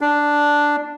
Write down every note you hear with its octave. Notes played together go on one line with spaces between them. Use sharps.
D4